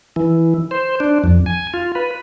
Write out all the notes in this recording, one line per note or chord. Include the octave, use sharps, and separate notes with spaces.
E3
C5
D4
F2
G#5
F4
B4